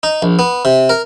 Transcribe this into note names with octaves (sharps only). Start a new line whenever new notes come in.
D#4
A#1
B3
C3
A#4